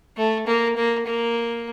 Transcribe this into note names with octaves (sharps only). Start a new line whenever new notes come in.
A3
A#3
A#3
A#3